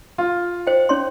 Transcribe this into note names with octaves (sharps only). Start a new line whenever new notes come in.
F4
C5 G5
C#4 C#5 C6